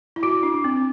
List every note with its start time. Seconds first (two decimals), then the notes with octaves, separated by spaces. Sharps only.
0.16 E4
0.23 F#4 D6
0.43 D4
0.54 D6
0.64 C4